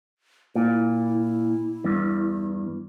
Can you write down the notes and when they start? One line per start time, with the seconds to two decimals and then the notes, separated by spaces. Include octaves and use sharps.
0.55 A#2 E4
1.84 E2 G2